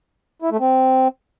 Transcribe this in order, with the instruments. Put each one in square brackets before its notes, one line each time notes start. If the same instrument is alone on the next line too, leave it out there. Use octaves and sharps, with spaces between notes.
[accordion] E4
A3
C4